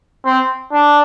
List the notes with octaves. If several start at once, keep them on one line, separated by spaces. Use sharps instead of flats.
C4
D4